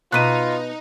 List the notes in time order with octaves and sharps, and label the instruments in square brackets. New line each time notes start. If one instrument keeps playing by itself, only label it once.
[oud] B2 B4 [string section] D#4 [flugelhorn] F4 [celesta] F#6 D#7